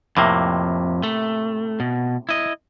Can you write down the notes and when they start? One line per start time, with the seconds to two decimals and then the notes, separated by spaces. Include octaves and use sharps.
0.17 F2 A2 C3 A#3
1.03 A3
1.80 B2
2.29 E4 D#5